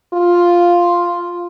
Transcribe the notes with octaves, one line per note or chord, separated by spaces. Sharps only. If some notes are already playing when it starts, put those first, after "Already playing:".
F4